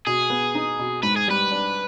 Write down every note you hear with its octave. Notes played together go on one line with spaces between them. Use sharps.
B2 G#4
B3
D#4
B2
G#2 B4
G#4
G3 B4
D4